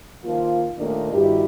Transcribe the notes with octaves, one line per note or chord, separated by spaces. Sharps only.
D#3 F3 A#3 F4
D#2 A#2 D#3 A3 D4 A#4
G2 D#3 E4 F#4 G4